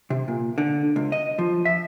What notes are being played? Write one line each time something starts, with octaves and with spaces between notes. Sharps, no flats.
C3
A#2
D3
C#2
D#5
F3
E5